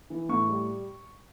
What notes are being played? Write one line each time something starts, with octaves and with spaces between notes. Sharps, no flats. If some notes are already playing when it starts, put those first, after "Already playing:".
E3
A2 C#6
G3